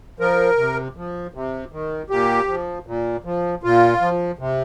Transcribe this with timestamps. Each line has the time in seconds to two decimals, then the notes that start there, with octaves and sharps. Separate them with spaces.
0.20 F3 A#4
0.58 C3
0.97 F3
1.34 C3
1.72 D#3
2.10 A#2 G4
2.48 F3
2.86 A#2
3.24 F3
3.63 A#2 F4
4.01 F3
4.39 C3